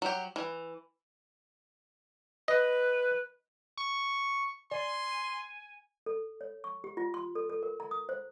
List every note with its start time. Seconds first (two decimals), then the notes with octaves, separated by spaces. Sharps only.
0.02 F#3 G4
0.36 E3
2.48 B4 D#5
3.77 C#6
4.71 D5 G#5 C6
6.06 A4
6.41 C#5
6.64 C#6
6.84 G4
6.97 F4
7.14 C6
7.35 A4
7.50 A4
7.63 A#4
7.80 A#5
7.91 D#6
8.09 C5